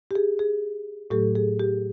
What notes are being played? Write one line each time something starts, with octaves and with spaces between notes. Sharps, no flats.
G4
G#4
G#4
A2 F#3 A3 G4 A4
G#4
G4